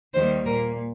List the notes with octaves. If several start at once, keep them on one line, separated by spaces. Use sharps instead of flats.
D#2 D#3 G3 A#3 C5
A#2 A#3 A#4